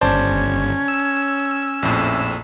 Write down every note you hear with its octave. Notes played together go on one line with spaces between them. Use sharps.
G1 C#4 C5 D5 A5
E6
A#1 F2 A2